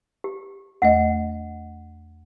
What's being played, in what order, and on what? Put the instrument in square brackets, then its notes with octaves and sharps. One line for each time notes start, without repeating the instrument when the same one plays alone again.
[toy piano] G4
[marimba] E2 A3 D#5 [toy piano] F#5